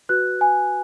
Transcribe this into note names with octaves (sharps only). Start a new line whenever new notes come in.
F#4 B4 F#6
G#5